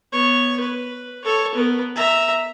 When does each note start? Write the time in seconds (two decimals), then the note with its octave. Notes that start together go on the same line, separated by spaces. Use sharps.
0.12 B3 C#5
0.60 B4
1.25 A4 C#5
1.55 B3 A#4
1.96 E5 A#5